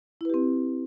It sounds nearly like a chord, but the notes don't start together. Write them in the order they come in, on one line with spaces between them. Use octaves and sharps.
E4 B4 G4 C4